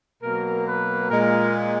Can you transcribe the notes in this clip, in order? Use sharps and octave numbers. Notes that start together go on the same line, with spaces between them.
B2 F#3 A#3 A#4
B4
A#2 G#3 A#4